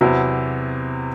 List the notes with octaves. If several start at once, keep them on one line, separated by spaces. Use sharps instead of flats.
E2 C3 F#3 B3 E4